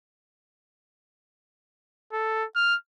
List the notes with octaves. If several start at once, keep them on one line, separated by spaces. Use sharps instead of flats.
A4
F6